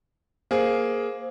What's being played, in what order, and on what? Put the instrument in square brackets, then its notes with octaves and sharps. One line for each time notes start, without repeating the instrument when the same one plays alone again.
[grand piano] A#3 G#4 [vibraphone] C5